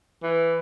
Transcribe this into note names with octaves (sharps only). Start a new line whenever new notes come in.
E3